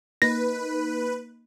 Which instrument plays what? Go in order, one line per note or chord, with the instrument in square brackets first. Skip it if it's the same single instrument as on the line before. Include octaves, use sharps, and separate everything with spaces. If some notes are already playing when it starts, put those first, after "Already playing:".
[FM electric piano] A#3 D#4 [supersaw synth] B4 [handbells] A#6